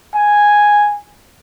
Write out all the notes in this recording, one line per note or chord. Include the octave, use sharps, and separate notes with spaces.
G#5